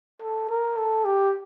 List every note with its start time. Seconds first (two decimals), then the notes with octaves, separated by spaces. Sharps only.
0.22 A4
0.49 A#4
0.77 A4
1.05 G4